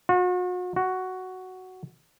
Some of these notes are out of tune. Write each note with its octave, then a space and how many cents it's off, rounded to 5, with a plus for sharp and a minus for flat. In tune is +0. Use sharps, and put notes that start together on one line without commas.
F#4 -40
F#4 +5